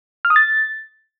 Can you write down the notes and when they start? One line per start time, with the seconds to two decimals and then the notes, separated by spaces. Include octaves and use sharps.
0.25 F6
0.30 D#6
0.36 A6